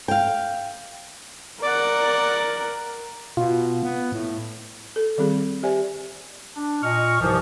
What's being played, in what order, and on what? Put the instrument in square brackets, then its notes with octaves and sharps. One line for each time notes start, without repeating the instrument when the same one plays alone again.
[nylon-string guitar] F5 G5
[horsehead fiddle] A#4 [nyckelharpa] D5 F#5
[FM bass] B2 [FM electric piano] F4
[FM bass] B3
A2
[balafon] A4
D#3 G3 C4 G#4
G4 C5 D5 E5 G#5
[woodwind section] D4
A#2 D#5 C#6 F6
C2 G#2 C3 E3 F3